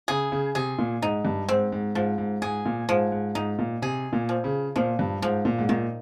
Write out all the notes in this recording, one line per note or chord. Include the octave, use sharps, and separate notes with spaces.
C#3 G#4
C#3
C3 G#4
A#2
G#2 D#4
G2
G#2 C4
G#2
G#2 F3
G#2
G#2 G#4
A#2
G#2 F3
G#2
G#2 D#4
A#2
C3 G#4
A#2
F3
C#3
A#2 F3
G2
G#2 F3
A#2
G#2
A#2 D#3